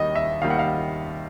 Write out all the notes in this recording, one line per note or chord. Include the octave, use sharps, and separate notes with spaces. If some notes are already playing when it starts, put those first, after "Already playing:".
Already playing: D#2 D#3 G3 D#5
E5
D#2 D#3 G3 F5
F#5
F5